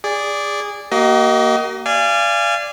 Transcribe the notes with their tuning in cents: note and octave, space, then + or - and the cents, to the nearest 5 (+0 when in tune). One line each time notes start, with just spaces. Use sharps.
G#4 -20 D5 -10
A#3 +0 F#4 +45 D#5 +15
D5 +0 F5 -30 G#5 -10